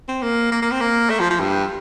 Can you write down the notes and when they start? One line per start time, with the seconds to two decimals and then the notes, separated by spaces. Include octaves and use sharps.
0.08 C4
0.22 A#3
0.52 A#3
0.62 A#3
0.71 C4
0.81 A#3
1.10 A3
1.20 F3
1.30 F3
1.40 G2